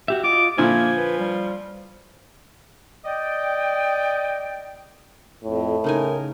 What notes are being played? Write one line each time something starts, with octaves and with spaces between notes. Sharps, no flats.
F#4 G4 E5
F4 D#5 D6
A#2 D3 F3 A#3 E4 G#5
B4
G3
D5 D#5 G5
F2 A2
C#3 D#4 A#4 G#5